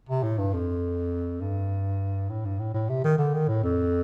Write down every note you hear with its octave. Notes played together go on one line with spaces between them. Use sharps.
C3
A2
G2
F2
G2
A2
G2
A2
A2
C3
D#3
D3
D#3
A2
F2